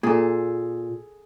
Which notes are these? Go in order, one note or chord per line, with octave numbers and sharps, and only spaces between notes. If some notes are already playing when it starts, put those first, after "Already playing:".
A#2 G#4 A4